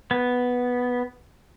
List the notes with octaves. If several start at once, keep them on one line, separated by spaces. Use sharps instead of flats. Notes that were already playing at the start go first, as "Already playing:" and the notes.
B3